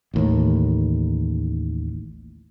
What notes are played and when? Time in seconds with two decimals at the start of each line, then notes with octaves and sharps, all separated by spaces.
0.14 A1 D#2 A2